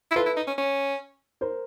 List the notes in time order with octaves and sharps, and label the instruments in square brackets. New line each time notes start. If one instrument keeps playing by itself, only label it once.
[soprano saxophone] E4
[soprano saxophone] F4 [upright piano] A4 B4
[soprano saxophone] E4
D#4
C#4
C#4
[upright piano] A#4 C5